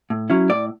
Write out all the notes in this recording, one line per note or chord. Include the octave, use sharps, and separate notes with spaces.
A2
F#3 C#4 E4
A2 D5